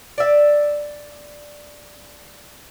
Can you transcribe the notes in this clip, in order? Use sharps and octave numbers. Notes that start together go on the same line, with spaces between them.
D5 E5